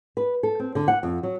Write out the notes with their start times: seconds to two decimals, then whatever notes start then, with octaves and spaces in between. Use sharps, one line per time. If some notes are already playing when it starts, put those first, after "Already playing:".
0.17 B4
0.43 A4
0.60 C4
0.75 D3
0.88 F#5
1.03 F2
1.23 F#3